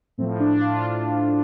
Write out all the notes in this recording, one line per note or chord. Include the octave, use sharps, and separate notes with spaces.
A2 F3 C4
D4
F4